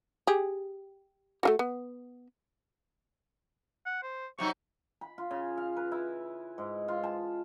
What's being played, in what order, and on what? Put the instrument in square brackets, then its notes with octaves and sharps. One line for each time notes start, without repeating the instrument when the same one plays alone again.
[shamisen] G4 G#4
A3 F4 F#4
B3
[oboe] F#5
C5
[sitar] C3 F#3 D#4 [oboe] C#6
[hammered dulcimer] B5
F4
C#3
F5
B4
E4
G#2
F4
A5